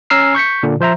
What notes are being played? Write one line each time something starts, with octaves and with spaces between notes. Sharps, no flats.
C#4 G#5 A#5 E6 F6 C7
C#6 G6 B6 C#7
A#2 D3
F3 C5 E5 A#5